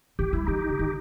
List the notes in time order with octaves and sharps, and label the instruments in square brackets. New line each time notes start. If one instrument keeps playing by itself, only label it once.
[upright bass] E3 [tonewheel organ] G4
[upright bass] G3 [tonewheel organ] E4
[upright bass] E3 [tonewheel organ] D#4 G4
[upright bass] C#3
D#3